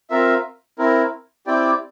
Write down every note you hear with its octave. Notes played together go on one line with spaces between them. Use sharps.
C4 F4 A#4 E5
C4 E4 A#4
C4 E4 G4 D5 G5